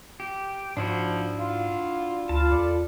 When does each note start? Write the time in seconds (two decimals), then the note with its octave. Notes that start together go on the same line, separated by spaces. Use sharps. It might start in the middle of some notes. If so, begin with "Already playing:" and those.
0.20 G4
0.77 G#2 F3 D4 E4 F#4
1.39 F4
2.29 D2 F4 A5 B5
2.52 E2 A4 D5